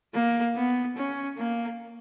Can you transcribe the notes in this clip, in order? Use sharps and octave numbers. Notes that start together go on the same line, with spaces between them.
A#3
B3
C#4
A#3